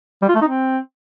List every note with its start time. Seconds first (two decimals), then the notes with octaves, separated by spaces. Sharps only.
0.23 G3
0.29 F4
0.35 A3
0.42 D#4
0.48 C4